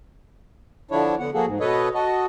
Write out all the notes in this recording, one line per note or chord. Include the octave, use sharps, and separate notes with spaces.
D3 F3 D4 E4 C#5
D3 B3 F#5
F3 A#3 F#4 G#4 A4
G#2
B2 A4 B4 C#5 D#5
F#4 A4 D#5